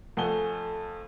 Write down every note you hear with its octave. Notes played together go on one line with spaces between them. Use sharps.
F2 A3 F#5 G#5 G7